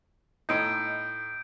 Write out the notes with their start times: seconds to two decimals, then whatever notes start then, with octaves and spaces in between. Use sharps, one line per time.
0.49 A2 D#4 G6 D7